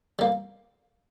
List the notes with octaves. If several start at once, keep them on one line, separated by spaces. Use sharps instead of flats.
G3 A#3